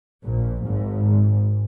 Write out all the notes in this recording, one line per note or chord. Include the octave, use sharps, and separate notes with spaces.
A#1 A#2
G#1 G#2